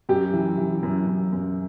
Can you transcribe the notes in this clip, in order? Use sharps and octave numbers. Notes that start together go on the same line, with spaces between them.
F#2 G4
E3
E3
F#2
F#2
F#2